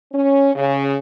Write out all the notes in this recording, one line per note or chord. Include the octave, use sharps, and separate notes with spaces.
C#4
C#3